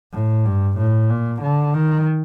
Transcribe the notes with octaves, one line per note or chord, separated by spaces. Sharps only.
A2
G2
A2
A#2
D3
D#3